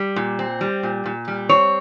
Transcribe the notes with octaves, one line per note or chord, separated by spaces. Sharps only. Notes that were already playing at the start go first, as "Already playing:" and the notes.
Already playing: G3
A#2
C4
G3
A#2
A#2
G3
C4 C#5